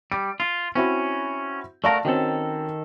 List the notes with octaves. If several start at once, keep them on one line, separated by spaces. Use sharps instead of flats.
G3 D7
F4
C4 C#4 E4 F#4
A3 F#4 A#4 D5 F5 A5
D#3 C4 C#4 F#4 A4